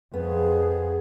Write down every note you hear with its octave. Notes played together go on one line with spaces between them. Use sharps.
F2 B3 G#4